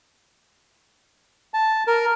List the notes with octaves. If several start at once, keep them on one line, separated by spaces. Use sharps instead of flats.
A5
A#4